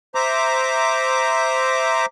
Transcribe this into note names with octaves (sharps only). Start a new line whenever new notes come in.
C5 E5 A#5 D6